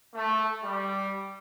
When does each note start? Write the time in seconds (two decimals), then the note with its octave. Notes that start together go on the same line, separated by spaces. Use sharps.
0.14 A3
0.64 G3